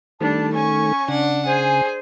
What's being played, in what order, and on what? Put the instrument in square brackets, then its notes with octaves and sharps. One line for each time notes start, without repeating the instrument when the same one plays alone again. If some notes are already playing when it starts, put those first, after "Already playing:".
[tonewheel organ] D#3 A3 [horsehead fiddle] G3 D4 [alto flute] A5
[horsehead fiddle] C#4 [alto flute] G#5 [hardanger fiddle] C#6
[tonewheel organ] C#3 [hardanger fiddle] D4 F#5
[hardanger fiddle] G#4 [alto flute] C5 [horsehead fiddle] G#5